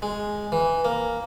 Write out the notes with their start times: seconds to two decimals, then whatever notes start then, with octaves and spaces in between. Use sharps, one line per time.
0.02 G#3
0.52 E3
0.85 A#3